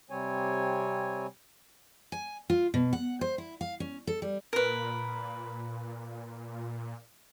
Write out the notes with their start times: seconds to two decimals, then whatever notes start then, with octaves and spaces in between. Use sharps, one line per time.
0.10 C3 G3 C4 C#5 G#5
2.12 G#5
2.50 F4
2.74 B2
2.93 F#5
3.21 C5
3.38 E4
3.61 F5
3.80 C#4
4.07 A4
4.22 G3
4.53 A#2 A#4 B4